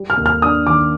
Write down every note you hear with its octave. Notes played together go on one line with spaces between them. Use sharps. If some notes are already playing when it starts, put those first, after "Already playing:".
Already playing: G3
F6
D#2
F6
D4 D#6
D#3 D6